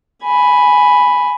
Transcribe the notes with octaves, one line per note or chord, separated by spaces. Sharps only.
G#5 B5